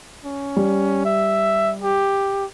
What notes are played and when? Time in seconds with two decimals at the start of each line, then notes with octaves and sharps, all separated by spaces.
0.24 C#4
0.56 G3
1.05 E5
1.82 G4